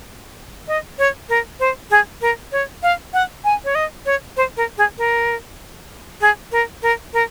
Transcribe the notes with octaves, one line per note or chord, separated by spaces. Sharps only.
D#5
C#5
A#4
C5
G#4
A#4
C#5
F5
F#5
G#5
C#5
D#5
C#5
C5
A#4
G#4
A#4
G#4
A#4
A#4
A#4